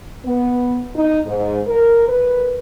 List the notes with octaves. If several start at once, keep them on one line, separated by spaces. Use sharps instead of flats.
B3
D#4
G#2
A#4
B4